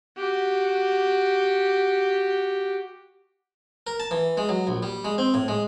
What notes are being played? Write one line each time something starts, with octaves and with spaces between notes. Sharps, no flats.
F#4 G4
A#4
A5
E3
G#3
F#3
A#1
G3
G#3
C4
A2
G#3